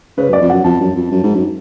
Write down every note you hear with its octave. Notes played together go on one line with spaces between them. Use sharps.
C#3 B4
F#2
D5
F2
F#2 F#5
F2 A5
F#2
F2
F#2
G#2
F#2